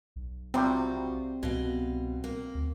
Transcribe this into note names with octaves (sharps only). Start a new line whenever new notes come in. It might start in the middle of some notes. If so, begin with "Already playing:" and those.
B1
C3 G3 C4 F4 F#4 G5
C2 B2 F5
A#3
D2